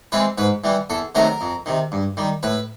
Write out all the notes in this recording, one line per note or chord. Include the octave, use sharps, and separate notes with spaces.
E3 G#3 C4 B4
G#2 B4
E3 G3 B3
E2 A4
C3 D#3 F#3 A3 A#4
F2
C3 D#3
G2
D#3 G3
A2 B4